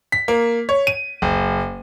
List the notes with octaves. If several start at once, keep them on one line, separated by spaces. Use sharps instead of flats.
B6
A#3
C#5
D#7
F#1